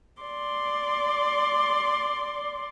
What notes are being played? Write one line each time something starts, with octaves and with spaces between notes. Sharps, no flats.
D5 C6